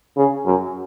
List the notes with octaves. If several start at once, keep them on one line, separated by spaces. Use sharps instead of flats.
C#3
F#2